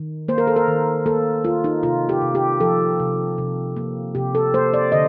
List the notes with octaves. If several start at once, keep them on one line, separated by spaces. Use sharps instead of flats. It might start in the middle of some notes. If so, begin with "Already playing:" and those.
Already playing: D#3
A#3 C5
A#4
A4
A#4
D#3
A#3 A4
A#3 F4
D#4
C3 F4
G4
C3
G4
F3 A4
C3
C3
A#3
C3 G4
A4
A#3 C5
D5
D3 D#5